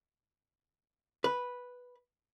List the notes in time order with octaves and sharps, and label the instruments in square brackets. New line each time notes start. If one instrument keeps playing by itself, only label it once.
[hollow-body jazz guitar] B4